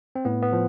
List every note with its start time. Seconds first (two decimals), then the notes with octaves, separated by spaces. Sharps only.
0.15 C4
0.25 A2 B3
0.43 B3
0.53 F3